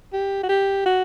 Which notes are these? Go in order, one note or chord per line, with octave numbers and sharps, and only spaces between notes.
G4
F#4
G4
F#4